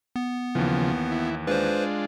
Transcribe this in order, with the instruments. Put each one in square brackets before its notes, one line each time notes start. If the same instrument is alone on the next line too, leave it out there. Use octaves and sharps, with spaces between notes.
[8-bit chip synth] B3
[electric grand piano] D#2 E3 [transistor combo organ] C#3 F3
[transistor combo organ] E4
[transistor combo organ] G#3 D4 F4 [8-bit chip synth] B4 C5